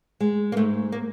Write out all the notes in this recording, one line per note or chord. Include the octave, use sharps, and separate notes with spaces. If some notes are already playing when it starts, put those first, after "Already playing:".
G#3
A#3
G#2 A3
A#3